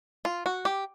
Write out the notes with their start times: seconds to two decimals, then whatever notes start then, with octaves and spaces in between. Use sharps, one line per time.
0.25 F4
0.46 F#4
0.65 G4